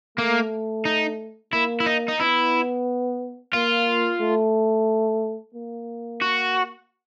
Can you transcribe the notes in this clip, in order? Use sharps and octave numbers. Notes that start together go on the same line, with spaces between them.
A3 A#3
D#4
A#3 E4
E4
D#4
D#4
B3 E4
A#3 F4
A3
A#3
F#4